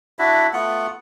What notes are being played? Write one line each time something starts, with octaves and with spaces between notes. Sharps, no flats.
D4 E4 F#4 E5
A3 B3 F4 F#5